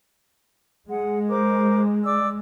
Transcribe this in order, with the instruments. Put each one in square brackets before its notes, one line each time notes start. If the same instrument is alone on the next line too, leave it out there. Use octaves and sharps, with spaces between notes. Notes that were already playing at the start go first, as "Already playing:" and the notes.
[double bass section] G#3 [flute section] G#4 F#5
[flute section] A#4 C5 D6
D5 D6 E6